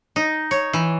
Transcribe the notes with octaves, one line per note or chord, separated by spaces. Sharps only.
D#4
C#5
E3